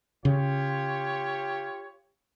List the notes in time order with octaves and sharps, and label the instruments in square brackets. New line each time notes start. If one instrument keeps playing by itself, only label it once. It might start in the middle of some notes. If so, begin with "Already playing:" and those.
[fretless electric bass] C#3 [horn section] F4 G4 C#5